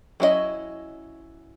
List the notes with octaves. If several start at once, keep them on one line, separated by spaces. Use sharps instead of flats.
F#3 C#4 E4 A4 D#5